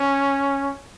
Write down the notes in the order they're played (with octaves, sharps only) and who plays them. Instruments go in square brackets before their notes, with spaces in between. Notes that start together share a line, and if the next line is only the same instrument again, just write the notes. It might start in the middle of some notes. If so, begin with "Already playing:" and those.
Already playing: [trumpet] C#4